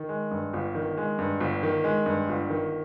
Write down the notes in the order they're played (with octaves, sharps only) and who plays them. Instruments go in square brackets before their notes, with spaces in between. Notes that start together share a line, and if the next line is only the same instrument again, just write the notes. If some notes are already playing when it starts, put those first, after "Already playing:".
Already playing: [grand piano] D#3
G#3
G2
G1
D#3
G#3
G2
G1
D#3
G#3
G2
G1
D#3